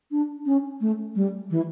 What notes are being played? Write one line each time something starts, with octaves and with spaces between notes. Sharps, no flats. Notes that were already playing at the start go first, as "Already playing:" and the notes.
D4
C#4
A3
G3
E3